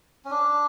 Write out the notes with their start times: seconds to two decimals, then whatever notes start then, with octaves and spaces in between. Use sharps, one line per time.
0.25 C#4
0.31 D4